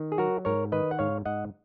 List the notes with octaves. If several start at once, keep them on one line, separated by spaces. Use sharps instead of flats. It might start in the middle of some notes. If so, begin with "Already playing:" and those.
Already playing: D#3
G#4
F#3 F#4 A#4
G#2 A#4 C#5
D#3 B4 D#5
F#5
G#2 C#5 F5
G#2 D#5 F#5